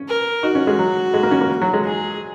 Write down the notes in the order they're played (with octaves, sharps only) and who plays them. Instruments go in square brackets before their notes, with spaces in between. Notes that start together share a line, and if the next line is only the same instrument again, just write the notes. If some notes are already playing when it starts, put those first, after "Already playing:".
Already playing: [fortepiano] C#4
[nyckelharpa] A#4
[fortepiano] D#4 [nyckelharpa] F#4
[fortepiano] C#4
G#3
F#3
G#3
A#3
C#4
A#3
F#3
G#3
[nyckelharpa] G#4